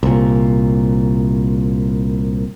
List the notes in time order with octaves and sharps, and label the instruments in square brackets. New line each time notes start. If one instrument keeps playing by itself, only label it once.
[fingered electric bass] C2 A#2